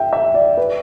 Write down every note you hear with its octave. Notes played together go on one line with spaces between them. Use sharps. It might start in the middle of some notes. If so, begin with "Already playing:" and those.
Already playing: E5 G5
E5
D5
B4